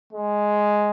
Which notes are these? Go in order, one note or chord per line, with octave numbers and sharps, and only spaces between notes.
G#3